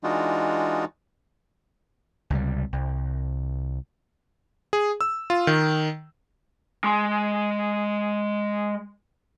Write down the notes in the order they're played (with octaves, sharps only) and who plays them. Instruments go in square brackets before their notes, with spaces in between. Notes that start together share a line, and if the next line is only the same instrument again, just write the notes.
[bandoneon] E3 G#3 D4 D#4 F4 F#4
[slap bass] C#2 C3 G3
C2
[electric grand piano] G#4
E6
F4
D#3
[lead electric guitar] G#3 C6